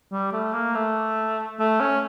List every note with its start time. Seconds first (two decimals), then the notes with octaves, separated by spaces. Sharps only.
0.12 G3
0.32 A3
0.53 A#3
0.75 A3
1.59 A3
1.80 C#4